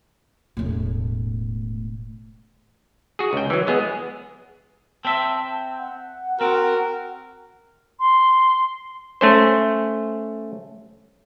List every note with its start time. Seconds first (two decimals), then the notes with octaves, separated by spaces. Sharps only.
0.57 E1 A2
3.19 F#4 G#4
3.33 C#2 G5
3.50 E3 F#3
3.67 G#3 B3 G#4
5.05 C4 E5 A5
5.79 F#5
6.41 C4 F#4 A#4
7.99 C6
9.21 A3 C#4 C5